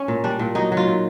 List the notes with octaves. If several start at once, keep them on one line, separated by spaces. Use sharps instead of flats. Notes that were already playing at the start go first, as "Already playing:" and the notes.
Already playing: C#4
A#2
G3 D4
A#2
F#3 D#4
F#3
F4
A#2